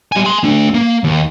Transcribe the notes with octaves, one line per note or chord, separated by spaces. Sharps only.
G3 G#5
G#5 C6
A3 D4
A#3
D#2